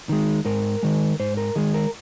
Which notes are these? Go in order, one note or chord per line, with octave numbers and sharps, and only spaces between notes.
D#3 G#3
G#2 A#4
D#3 G#3
G#2 C5
A#4
D#3 G#3 G#4
A#4